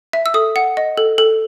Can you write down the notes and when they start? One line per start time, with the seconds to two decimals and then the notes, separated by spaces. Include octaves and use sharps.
0.13 E5
0.26 E6
0.34 A4 D#6
0.56 F#5
0.77 D#5
0.97 A4
1.18 A4